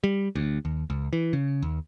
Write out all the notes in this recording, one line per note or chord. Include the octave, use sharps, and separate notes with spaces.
G3
D2
D#2
C#2
E3
C#3
D#2